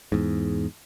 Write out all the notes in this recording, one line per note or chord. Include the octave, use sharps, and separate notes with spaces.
E2 G#2